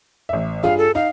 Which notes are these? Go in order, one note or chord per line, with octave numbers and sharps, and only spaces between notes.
A1 E5
G2 F4 G#4 F5
A4
D#4 F5